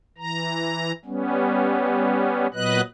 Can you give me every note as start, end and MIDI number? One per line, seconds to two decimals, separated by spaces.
0.18 0.92 52
0.18 0.92 82
1.05 2.47 55
1.05 2.47 59
1.05 2.47 61
2.54 2.81 46
2.54 2.81 54
2.54 2.81 59
2.54 2.81 71
2.54 2.81 75
2.54 2.81 90